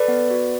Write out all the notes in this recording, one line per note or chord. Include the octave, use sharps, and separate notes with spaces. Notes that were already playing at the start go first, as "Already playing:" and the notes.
Already playing: A4 B4 D5
B3
F#4